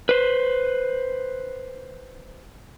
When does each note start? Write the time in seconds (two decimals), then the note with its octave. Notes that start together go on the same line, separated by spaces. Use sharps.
0.09 B4 C5